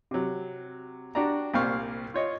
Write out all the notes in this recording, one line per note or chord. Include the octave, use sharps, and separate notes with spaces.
C3 F#3
D4 F#4 G4 D5 A#5
C2 A#2 C5 F5 C#6
F4 C#5 D#5